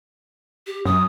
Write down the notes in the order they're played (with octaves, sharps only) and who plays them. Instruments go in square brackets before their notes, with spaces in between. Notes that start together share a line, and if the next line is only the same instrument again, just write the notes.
[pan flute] G4
[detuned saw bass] F#2 [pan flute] D#6